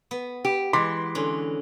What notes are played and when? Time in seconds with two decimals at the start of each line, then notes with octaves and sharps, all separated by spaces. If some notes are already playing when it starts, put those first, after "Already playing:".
0.11 B3
0.45 G4
0.73 E3 G#3 C6 D6 B6
1.15 D3 C#4